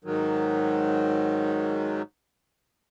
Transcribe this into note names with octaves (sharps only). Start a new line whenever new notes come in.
G#2 D#3 F#3